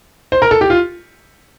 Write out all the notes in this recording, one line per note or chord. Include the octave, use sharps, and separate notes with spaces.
C5
A#4
A4
G4
F4